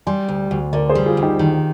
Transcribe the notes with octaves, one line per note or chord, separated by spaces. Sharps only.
G3 G#5 C6
D2
D2
D3 A#4 D5
G#4 C5
G3
F4 G#4
D2
D#4 G4
D#3